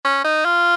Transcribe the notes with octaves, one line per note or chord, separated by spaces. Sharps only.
C#4
D#4
F4